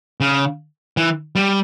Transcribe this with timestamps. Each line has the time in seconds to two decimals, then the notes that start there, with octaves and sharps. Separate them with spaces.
0.20 C#3
0.97 E3
1.35 G3